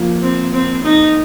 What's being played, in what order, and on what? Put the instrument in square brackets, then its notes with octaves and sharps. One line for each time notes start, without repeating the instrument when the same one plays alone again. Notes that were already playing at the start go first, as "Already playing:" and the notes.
Already playing: [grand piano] F3 A#3
[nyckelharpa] C4
C4
D#4